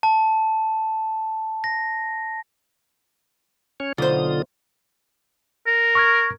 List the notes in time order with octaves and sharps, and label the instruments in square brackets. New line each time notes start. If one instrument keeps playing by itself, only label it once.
[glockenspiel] A5
A#6
[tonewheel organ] C#4 C#5
[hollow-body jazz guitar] B1 C5 [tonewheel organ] D3 F4 D#6
[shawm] A#4
[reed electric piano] C#6 F6 G#6